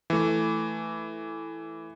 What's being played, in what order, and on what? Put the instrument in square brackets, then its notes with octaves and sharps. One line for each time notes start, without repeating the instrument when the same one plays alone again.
[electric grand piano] E3 A3